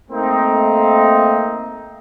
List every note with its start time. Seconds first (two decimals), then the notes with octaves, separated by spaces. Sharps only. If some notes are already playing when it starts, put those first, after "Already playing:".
0.11 A3 A#3 C4 D#4